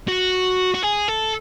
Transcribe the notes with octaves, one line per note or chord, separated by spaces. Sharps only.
F#4
F#4
G#4
A4